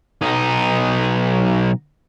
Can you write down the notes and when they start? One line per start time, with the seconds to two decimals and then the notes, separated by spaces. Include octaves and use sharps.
0.21 B1 D#4